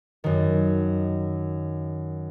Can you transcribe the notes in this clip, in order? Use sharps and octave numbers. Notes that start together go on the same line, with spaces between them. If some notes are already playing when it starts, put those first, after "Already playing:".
F#2 D#3